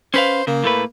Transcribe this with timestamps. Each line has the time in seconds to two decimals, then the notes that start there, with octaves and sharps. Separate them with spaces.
0.14 C#4 B4 C5 F5
0.47 C#3 A#3
0.64 A2 A3 B4